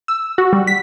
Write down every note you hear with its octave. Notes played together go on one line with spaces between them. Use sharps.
E6
F#4
G3
B6